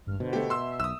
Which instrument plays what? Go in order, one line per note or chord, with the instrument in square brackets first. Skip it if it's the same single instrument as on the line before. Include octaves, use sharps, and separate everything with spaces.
[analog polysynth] G#1 G2 F6
[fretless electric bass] B2 [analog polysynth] D3 C5
[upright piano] A3 G4
[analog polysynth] E5 [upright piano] C6 E6
[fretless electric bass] B1 [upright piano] D#6 E6